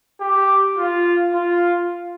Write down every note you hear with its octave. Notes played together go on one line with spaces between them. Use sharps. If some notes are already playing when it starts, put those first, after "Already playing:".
G4
F4
F4